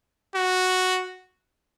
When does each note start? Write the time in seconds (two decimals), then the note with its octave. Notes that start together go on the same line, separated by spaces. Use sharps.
0.35 F#4